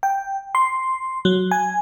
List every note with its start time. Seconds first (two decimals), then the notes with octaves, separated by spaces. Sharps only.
0.03 G5
0.55 C6
1.25 F#3
1.51 G#5